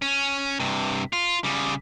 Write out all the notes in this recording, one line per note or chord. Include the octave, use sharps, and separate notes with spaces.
C#4
G2 C3
F4
C#3 G3